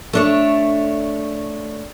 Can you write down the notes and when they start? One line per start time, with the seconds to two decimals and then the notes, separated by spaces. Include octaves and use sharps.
0.13 A3 D4 C#5